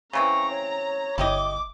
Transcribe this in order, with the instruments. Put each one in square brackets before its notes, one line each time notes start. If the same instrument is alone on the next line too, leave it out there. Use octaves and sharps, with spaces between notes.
[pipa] C#3 E3 C4 [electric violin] A#5 [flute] C#6
[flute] C#5
[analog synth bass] G1 [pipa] E4 G4 D#5 [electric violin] D6